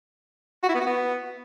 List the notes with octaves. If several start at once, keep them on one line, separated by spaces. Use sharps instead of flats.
F#4
E4
B3
F#4
B3